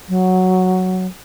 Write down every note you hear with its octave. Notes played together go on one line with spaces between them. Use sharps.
F#3